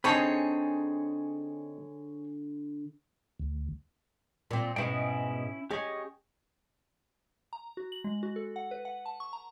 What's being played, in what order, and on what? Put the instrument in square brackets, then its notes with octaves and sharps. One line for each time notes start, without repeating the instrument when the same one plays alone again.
[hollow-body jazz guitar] D3 B5 [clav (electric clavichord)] C4 D#4 [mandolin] G#4 C#5 A5
[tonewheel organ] D2
[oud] A#2 C4
[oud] G#2 B2 [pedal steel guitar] C#4 E4 G5
[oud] C#4 G#4 [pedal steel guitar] G4 D#5 C#6
[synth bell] A#5
F#4
F#7
G#3
F#4
A4
F#5
B4
F#5
A5
C#6
A#5